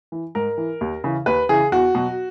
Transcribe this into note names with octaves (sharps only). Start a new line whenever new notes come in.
E3
G#2 A#4
E3
D#2
C#3 E3
D#2 B4
C#3 E3 G#4
E2 F#4
B2 F#3